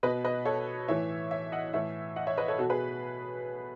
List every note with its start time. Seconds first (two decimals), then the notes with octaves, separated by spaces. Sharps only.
0.03 B2 B4 D#5
0.24 B4 D#5
0.45 A4 C#5
0.88 A2 E3 C#5 E5
1.31 C#5 E5
1.52 D#5 F#5
1.73 A2 E3 C#5 E5
2.16 D#5 F#5
2.27 C#5 E5
2.37 B4 D#5
2.48 A4 C#5
2.58 B2 F#4 A4
2.69 G#4 B4